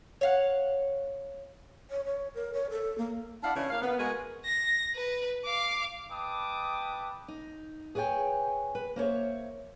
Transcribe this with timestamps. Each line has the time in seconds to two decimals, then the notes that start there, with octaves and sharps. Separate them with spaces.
0.21 C#5 F5 F#5
1.90 C#5
2.05 C#5
2.35 A#4
2.54 C#5
2.71 A4
2.98 A#3
3.43 D4 E4 D5 F5 F#5
3.55 C#3 E3 D4 E4 C#5
3.70 A#3 F5
3.82 B3
3.98 G#3 F#4 G#4 A#4 B4
4.45 A#6
4.95 B4
5.45 F5 D6
6.10 B4 D#5 G5 A5 D6 D#6
7.28 D#4
7.95 G#4 B4 C#5 D5 G5 G#5
8.75 B4
8.96 A#3 C5 C#5 E5